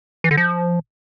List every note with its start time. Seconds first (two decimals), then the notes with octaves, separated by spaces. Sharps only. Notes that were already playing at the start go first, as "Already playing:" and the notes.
0.24 E3
0.31 D3
0.37 F3